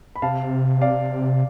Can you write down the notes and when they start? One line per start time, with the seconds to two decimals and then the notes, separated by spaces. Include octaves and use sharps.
0.16 B5
0.22 C3 F5 A5
0.81 D5 F5